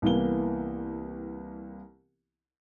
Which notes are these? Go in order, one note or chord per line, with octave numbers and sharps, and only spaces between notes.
C2 E3 A#3 B3 G7